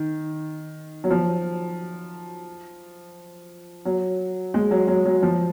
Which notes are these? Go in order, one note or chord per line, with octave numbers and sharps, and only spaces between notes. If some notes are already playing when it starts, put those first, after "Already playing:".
Already playing: D#3
F#3
F3
F#3
G#3
F#3
F#3
F#3
F3